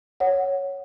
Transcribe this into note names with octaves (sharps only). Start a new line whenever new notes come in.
C#5 F#5